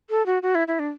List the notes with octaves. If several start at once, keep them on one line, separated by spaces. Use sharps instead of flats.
A4
F#4
F#4
E4
E4
D4